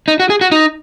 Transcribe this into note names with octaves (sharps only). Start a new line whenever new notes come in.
D#4
F#4
G#4
F#4
D#4